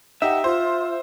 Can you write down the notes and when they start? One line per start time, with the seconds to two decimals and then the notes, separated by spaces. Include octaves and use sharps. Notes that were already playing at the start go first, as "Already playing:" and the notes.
0.22 D#4 G4 E5 F#5
0.44 F4 C5